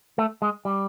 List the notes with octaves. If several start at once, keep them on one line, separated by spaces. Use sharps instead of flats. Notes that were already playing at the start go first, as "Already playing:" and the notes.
A3
G#3
G3